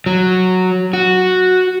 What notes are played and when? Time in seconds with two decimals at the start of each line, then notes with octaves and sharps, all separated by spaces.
0.06 F#3
0.93 F#4